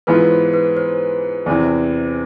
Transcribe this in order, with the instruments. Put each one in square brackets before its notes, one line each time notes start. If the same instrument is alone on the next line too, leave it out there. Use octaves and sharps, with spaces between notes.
[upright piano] G#2 E3 B3 F4 [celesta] B4
[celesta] C5
B4
C5
[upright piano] E2 C3 E3